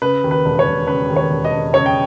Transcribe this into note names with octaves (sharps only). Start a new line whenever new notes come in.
C#3 B4
D#2
B4
E1
C#5
E1
C#3 B4
D#2
C#5
E1
D#5
E1
C#3 C#5
G5